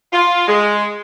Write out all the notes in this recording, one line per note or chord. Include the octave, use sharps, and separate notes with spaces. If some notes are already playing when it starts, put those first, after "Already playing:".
F4
G#3